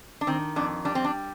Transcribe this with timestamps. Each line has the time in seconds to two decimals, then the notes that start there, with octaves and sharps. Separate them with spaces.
0.21 D4
0.27 D#3 C4
0.56 F2 D4
0.85 G3 D4
0.95 C4
1.04 D4